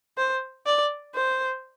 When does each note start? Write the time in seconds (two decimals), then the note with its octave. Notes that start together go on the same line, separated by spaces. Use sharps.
0.18 C5
0.66 D5
1.15 C5